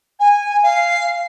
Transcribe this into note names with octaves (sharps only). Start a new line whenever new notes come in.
G#5
F5